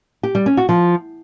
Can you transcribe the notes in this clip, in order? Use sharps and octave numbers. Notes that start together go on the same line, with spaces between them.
G4
G3
C#4
F#4
F3